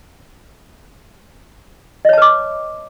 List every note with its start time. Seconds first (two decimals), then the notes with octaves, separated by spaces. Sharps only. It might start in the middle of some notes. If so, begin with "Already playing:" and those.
2.05 D#5
2.09 C#5
2.13 A5
2.17 B4
2.22 D6